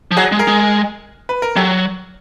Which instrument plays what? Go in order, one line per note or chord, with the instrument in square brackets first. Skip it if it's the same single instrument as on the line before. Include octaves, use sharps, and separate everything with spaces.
[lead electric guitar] F3
[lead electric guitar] F#3 [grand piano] F#4 G#4
[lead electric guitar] G#3
[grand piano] G#4 A#4
[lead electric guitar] G#3
[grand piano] B4
A#4
[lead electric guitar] F#3 [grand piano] G4 A4